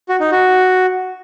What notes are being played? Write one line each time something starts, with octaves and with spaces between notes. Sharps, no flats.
F#4
D#4
F#4